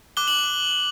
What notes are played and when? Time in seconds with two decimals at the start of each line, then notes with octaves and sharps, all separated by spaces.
0.17 D6 F#6 G7
0.27 F#7